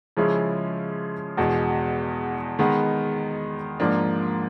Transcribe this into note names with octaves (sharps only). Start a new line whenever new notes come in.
C#3 F3 G#3 C#4 E4
E2 B2 G#3
D#3 G#3 B3
G#2 F3 A#3 D4